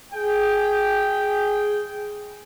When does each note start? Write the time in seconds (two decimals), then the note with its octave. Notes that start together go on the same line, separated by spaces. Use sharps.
0.12 G#4 G5